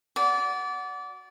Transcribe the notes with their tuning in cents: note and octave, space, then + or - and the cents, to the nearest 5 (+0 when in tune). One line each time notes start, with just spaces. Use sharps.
F#4 +0 D5 -25